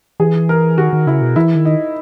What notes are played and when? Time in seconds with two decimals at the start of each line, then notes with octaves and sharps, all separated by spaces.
0.20 E3 G#4
0.49 A#4
0.78 D#3 F#4
0.93 D#3
1.07 C#3 E4
1.21 B2
1.36 E3 E4
1.55 D#3
1.65 D#4